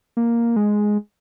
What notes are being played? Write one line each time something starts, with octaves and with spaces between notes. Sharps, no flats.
A#3
G#3